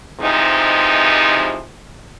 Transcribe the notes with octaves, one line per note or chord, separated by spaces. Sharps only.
G2 C3 E3 F3 G#3 D#4